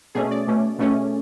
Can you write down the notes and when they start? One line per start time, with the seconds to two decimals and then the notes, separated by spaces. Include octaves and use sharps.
0.15 B2 A3 C#4 G#4
0.31 D5
0.47 B2 A3 C#4
0.78 B2 A3 C#4